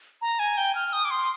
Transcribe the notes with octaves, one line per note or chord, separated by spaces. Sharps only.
A#5
G#5
G5
F6
D#6
D6
C6